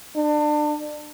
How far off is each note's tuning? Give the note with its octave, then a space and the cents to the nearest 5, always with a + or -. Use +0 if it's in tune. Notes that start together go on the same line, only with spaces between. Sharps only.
D4 +30